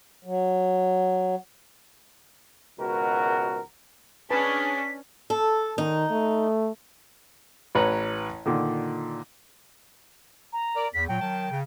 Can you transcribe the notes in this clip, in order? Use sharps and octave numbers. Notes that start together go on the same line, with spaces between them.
F#3
G#1 C#2 B2 F#4 A#4
C#4 D4 G#4 B4 A5 B6
A4
D#3 D#4
A3
A1 B4 C#5 A#5
A#2 D3 D#3
A#5
A#4 D5
E2 B6
A#2 F#3 G5
D#3 F#3 A5
C#3